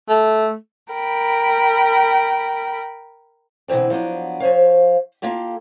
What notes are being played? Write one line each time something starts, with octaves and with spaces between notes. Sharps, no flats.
A3
A#4 G5 B5
B2 D3 E3 C4 D4
F3 F#3 B3 D4
F3 C5 C#5 F5
A#3 F4 G4 A4